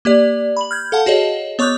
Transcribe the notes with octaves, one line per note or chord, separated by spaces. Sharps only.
A#3 G4 D5
B5 F#7
F6 G6 G#6
A4 F5 F#5 A5
F#4 G#4 C#5 D#5
B3 C#5 C#6 D6 F#6 G6